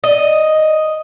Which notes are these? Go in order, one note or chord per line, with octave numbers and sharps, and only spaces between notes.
D#5